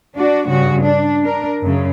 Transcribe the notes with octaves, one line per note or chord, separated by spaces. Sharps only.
D4 F#4 D5
G2 C#3 F#4
D4
D4 A#4
F#2 C#3